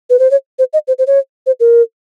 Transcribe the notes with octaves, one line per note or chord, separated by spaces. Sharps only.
B4
C5
C#5
C5
D#5
C5
C5
C#5
C5
A#4